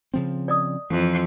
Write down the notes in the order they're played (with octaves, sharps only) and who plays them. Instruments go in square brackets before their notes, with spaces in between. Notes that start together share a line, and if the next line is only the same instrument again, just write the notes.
[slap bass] C#3 F3 C4
[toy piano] D5 D#5 D#6
[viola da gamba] F2 [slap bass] E3